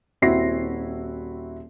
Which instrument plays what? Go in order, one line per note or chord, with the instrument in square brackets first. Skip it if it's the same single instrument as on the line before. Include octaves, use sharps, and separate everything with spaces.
[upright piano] D#1 C4 E4 F#4 A#6 C7